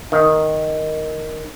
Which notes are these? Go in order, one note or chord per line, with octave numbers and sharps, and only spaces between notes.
D#3